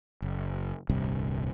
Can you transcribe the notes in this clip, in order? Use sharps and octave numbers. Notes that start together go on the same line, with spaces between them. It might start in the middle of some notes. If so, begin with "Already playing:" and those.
F#1
D#1 C2 G2 C3